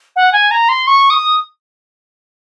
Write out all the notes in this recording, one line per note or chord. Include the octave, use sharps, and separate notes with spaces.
F#5
G#5
A#5
C6
C#6
D#6